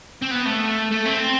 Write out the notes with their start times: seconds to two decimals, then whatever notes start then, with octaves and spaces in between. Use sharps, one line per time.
0.22 C4
0.31 B3
0.45 A3
0.91 A3
1.05 C4